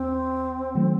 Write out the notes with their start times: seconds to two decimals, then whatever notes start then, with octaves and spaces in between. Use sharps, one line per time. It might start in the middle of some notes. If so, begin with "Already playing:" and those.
Already playing: D#2 C4
0.75 D#3 F#3 A3